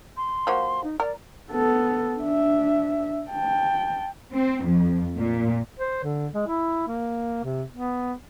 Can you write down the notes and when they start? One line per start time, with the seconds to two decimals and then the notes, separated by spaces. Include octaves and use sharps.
0.17 C6
0.47 F3 A#3 F#4
0.84 D#4
1.00 A#4 D5
1.52 B3 A4
2.19 D4 E5
3.30 G5 A5
4.34 C4
4.65 F2
5.19 A#2
5.79 C5
6.04 D3
6.34 G#3
6.47 E4
6.88 A#3
7.44 C3
7.72 B3